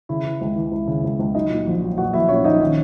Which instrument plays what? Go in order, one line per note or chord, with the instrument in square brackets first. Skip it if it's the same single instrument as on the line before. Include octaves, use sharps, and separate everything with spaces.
[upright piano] C#3 E4
E3
C#2
E3
C#2
C#3
C#2
C#2
F#3 D#4 D#5
A#2
A#1
F#3
A#2 F#4 F#5
A#1 E4 E5
A#2 C#4 C#5
A#1 D#4 D#5
D#3 C#4 C#5